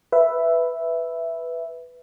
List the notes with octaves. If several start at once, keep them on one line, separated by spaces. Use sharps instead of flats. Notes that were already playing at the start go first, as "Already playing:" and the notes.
B4 E5